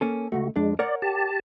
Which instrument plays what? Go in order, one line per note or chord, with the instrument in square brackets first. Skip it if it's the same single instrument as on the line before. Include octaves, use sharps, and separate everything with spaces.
[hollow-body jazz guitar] A#3 C#4 A4
[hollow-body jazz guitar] C#2 F#2 A3 [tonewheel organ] F#4
[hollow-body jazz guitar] F2 D4 [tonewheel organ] G#3
[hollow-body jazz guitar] A#4 C#5 F#5 [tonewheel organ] D5
[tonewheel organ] G4 A5